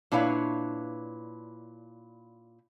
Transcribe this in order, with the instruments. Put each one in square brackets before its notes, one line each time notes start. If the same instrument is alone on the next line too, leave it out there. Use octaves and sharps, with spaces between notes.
[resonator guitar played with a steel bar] A#2 D4 E4 B4 C#5 F5